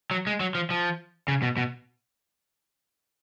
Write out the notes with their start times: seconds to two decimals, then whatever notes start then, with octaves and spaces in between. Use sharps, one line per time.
0.11 F#3
0.27 G#3
0.40 F#3
0.55 F3
0.71 F3
1.28 C#3
1.42 B2
1.57 B2